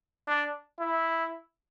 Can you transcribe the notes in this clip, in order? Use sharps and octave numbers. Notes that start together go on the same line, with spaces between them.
D4
E4